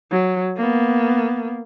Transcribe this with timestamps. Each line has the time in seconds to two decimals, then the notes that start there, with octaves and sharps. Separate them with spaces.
0.12 F#3
0.57 A#3 B3